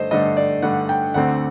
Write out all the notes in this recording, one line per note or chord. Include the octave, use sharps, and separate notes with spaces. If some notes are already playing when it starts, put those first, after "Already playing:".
Already playing: G2 D3 A3 C5 D#5
G2 D3 A3 D#5
D5
G2 D3 A3 F#5
G5
D2 D3 A3 C4 F#5